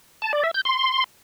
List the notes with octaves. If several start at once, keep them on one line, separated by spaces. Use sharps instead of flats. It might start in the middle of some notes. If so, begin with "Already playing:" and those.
A5
D5
E5
G6
C6